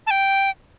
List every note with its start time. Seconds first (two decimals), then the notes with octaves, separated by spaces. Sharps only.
0.07 A5
0.11 G5